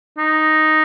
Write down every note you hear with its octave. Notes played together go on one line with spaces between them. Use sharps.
D#4